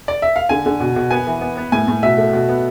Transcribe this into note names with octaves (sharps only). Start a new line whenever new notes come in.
D5
E5
F5
D3 G#5
D3
B2
B2
B3 G#5
E3
B3
B3
A2 G#5
A2
B2 E5
A3
B2
B3